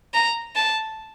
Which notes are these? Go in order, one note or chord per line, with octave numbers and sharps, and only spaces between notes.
A#5
A5